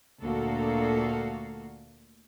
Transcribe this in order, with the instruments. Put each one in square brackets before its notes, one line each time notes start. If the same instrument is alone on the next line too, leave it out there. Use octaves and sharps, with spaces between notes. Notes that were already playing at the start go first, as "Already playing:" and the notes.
[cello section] D2 A#2 A#3 F#4 A4 F5